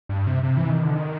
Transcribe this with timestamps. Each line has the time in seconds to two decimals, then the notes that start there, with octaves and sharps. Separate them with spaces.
0.09 G2
0.27 C3
0.43 C3
0.57 E3
0.70 D#3
0.83 D3
0.95 D#3